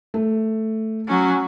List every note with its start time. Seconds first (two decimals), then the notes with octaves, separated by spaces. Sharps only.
0.14 A3
1.08 F#3 C#4